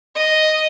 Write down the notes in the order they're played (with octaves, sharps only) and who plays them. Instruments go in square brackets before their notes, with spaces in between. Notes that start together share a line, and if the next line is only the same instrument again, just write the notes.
[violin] D#5